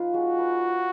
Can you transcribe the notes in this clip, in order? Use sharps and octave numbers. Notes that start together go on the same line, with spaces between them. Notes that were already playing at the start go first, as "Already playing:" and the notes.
Already playing: F3 D#4 F4 B4
G#3 F#4
B4